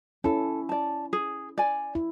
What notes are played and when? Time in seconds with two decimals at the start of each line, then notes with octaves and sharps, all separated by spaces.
0.24 C#4 E4 A4
0.69 D5 A5
1.13 G#4
1.58 D5 G#5
1.95 E4